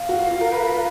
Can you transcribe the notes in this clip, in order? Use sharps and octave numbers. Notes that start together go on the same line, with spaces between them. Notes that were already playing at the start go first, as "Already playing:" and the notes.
Already playing: F5
F#4
F4
F4
A#4
B4
A#4